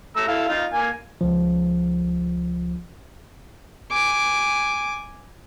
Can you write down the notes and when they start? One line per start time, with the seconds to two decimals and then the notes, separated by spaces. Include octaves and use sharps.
0.17 A3 A#5 E6
0.28 E4 A4 F5
0.49 D#4 F4
0.73 A#3 G#5
1.21 C#2 F3
3.91 G#5 D6